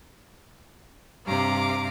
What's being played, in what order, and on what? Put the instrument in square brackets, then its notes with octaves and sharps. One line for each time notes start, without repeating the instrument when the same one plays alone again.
[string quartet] G2 C3 F5 A#5 D6